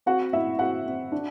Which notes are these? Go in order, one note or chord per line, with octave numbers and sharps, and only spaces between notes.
C4 F#4 F#5
A2 E4 E5
C4 F#4 F#5
C4
D4